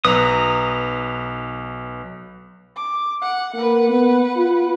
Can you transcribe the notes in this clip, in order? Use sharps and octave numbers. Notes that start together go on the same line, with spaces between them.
B1 B4 A#5 D#6
D6
F#5
A#3 B4 F#5
B3
F4